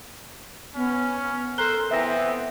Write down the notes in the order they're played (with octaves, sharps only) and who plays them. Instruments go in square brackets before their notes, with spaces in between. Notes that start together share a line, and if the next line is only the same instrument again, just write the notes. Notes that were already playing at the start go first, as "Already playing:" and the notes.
[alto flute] B3 [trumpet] C#4
[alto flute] A4 [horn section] A#4 C5 [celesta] A#5 F#6 G7
[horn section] E3 B3 [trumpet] C4 [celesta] E5 A#6